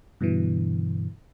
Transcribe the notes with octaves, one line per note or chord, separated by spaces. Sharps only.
G2 B2 D3 E3